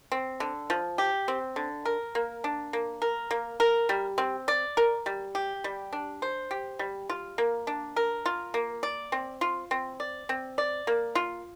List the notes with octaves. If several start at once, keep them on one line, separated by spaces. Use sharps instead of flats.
C4
D3
F3
G4
C4
D3
A#4
A#3
D4
A#3
A#4
A#3
A#4
G3
C4
D5
A#4
G3
G4
G3
D4
C5
G4
G3
F4
A#3
D4
A#4
F4
A#3
D5
C4
F4
C4
D5
C4
D5
A#3
F4